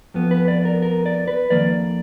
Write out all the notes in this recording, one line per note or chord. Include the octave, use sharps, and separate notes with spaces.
F2 F3 B3
B4
D5
A#4
A#4
D5
B4
F2 D#3 A#3 D5